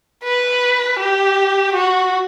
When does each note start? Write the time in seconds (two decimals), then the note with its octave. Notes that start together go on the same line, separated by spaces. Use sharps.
0.24 B4
0.99 G4
1.74 F#4